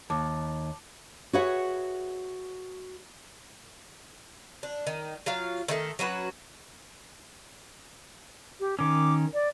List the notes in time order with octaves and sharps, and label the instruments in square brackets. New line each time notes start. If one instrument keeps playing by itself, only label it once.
[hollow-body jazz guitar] D#2 [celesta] A5 D6
[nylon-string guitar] F#4 G#4 B4 C#5 E5 F#5
[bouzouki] D4
D#3
F#3 F4 F5
D#3 A3 A4 A#4
F#3 C#4 F#4 B4
[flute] G4
[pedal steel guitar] D#3 C#4 [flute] D6
[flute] D5